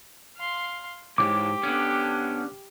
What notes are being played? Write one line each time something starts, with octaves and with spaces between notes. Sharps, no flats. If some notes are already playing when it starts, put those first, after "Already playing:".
F5 C6
B1 G#2 E3 G4 C#5 D6
D3 B3 C#4